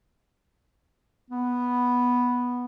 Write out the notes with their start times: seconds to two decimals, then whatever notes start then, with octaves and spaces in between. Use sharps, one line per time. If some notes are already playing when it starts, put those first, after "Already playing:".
1.31 B3